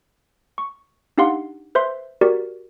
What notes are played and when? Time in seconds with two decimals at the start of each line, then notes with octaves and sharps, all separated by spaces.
0.58 C#6
1.18 D4 D#4 G4 F5 F#5 C6
1.75 B4 C5 E5 C6
2.21 F#4 G4 A#4 D5